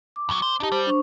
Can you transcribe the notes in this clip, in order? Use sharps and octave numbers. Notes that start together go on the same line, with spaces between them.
D6
E2 F#3
C5
D4 D#4 G4 A5
G3 C5
D4 C5 C#6